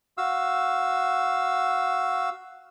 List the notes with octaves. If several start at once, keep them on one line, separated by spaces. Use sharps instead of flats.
F#4 F5 E6